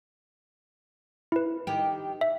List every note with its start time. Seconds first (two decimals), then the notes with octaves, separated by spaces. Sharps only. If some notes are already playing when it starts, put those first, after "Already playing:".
1.32 E4 B4
1.67 D#3 G4
2.21 E5